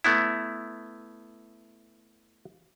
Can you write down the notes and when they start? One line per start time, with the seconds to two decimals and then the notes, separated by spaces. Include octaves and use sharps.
0.04 A3 B3 E4